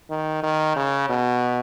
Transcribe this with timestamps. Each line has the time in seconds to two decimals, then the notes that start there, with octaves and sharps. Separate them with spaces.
0.10 D#3
0.43 D#3
0.76 C#3
1.09 B2